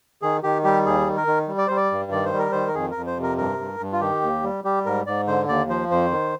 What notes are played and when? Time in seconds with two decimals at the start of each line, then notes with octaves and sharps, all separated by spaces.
0.22 D#3 G#4
0.43 D#3 G4
0.64 G3 G4
0.85 D#2 G#4
1.07 D#3
1.17 A#4
1.27 D#3
1.48 G3
1.58 D5
1.67 G3 C5
1.77 D5
1.91 G2
2.12 D#3 D5
2.25 C5
2.33 G3
2.38 A#4
2.52 D#3 C5
2.67 A#4
2.75 F2 G#4
2.91 F2 A#4
3.07 C5
3.17 C3
3.23 A#4
3.38 G2 A#4
3.58 G2
3.79 G2
3.92 F4
4.01 D#3 G4
4.22 D#2
4.43 G3
4.64 G3 G4
4.85 G#2 A#4
5.06 G#2 D5
5.27 D3 C5
5.48 D#2 D5
5.69 F3 C5
5.91 F2 C5
6.11 D#3